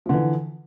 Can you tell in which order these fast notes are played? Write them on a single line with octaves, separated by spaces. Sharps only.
F3 D3 E3